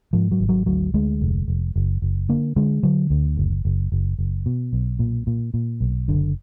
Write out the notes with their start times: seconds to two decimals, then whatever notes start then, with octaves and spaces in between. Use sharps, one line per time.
0.13 G#2 F3
0.31 F#3
0.40 G#1
0.49 F#3
0.66 D2 F#3
0.94 D2 G#3
1.22 F1
1.48 F1
1.76 F#1
2.02 F#1
2.29 D3 A#3
2.56 D3 G#3
2.83 D3 F#3
3.10 D2
3.37 F#1
3.65 F#1
3.92 F#1
4.19 F#1
4.46 B2
4.73 B1
4.99 A#2
5.27 A#2
5.54 A#2
5.81 B1
6.08 F#1 D3